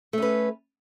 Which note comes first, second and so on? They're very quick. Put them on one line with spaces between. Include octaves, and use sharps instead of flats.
A3 C#4 B4